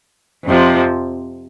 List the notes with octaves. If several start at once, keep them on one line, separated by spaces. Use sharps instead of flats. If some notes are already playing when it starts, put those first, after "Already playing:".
F2 C3 F3